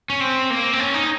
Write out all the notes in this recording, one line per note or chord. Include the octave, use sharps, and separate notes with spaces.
C#4
C4
A#3
C4
C#4
D#4